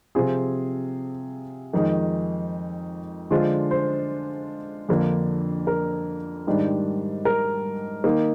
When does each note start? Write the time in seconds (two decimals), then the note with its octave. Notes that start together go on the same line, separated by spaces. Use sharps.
0.15 C3 F3 C4 F4 G#4
1.73 F2 D#3 G#3 D#4
3.30 D3 F3 G#3 D4 F4 C5
3.71 C5
4.89 F2 D3 F3 A#3 D4
5.67 A#4
6.47 G#2 D#3 G3 D4
7.25 A#4
8.04 D#3 A#3 D#4